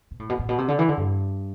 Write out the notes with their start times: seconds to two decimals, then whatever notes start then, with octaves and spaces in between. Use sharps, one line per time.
0.11 B2
0.19 A2
0.29 B2
0.39 A2
0.49 B2
0.58 C3
0.68 D3
0.79 E3
0.89 D3
0.97 G2